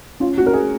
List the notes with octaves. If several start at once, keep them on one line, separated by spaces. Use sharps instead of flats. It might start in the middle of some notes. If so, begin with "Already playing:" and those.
C#4 F4
F#4
C#4 A#4
G#4